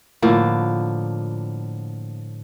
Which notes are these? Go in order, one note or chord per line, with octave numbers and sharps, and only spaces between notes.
A2 D3 F3 A#3